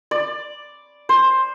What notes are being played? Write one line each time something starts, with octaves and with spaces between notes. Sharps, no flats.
D5
C5